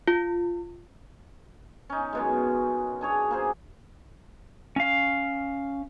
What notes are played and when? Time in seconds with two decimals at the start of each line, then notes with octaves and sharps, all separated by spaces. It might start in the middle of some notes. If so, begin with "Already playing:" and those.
0.08 F4
1.89 C#4 D#4
2.13 F#2 B2 G#3
3.01 D4 G#4 C#5
3.31 A#3 G#4 C5
4.76 C#4 F5